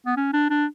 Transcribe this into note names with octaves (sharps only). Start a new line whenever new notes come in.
B3
C#4
D4
D4